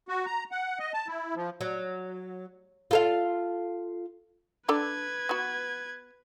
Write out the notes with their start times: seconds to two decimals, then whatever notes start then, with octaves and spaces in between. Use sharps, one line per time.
0.08 F#4
0.26 A#5
0.51 F#5
0.79 D#5
0.94 A5
1.07 E4
1.35 F3
1.61 F#3
2.91 F4 A4 F5
4.68 D4 A4 B4 D5 G#6
5.29 B3 F#4